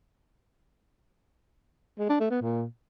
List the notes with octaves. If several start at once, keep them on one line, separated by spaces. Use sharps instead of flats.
G#3
D4
A3
B3
A#2